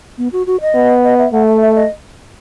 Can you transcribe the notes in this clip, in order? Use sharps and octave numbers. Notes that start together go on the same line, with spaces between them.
B3
F#4
F#4
D#5
B3
D#5
E5
A3 F#5
E5
E5
D#5